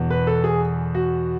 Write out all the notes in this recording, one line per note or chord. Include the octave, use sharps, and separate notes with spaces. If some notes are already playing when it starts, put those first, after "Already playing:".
Already playing: E2 B2
B4
A4
G#4
F#4